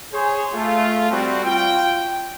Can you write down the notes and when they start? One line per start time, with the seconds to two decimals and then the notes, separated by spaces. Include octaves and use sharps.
0.13 G#4 C5 C#5
0.54 A3 F4
1.11 G3 C4 F#4
1.44 F4 G5